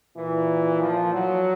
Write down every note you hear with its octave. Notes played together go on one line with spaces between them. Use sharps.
A#2 E3
F3
F#3